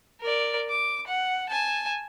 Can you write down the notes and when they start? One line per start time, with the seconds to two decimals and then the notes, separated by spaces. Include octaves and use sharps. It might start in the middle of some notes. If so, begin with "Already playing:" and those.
0.21 A#4 D5
0.69 D6
1.07 F#5
1.49 G#5 A5